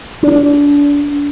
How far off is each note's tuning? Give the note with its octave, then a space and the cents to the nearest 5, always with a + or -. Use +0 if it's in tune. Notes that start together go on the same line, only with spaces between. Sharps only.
D4 -30